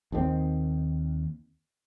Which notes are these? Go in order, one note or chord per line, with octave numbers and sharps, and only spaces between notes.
D#2 D#3 G3 C4